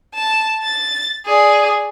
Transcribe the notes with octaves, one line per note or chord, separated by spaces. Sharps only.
A5
A6
G#4 D5